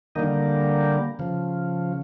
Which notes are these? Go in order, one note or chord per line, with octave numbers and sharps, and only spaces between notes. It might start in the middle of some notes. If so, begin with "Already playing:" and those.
D3 D#3 G3 A#3 D#4
C#3 F3